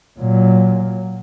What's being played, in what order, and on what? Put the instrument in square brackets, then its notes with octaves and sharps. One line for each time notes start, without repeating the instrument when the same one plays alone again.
[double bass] A#2 F#3